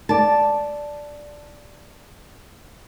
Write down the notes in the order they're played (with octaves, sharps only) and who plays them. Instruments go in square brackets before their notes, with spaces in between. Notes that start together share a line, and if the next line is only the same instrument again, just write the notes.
[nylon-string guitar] D5 A5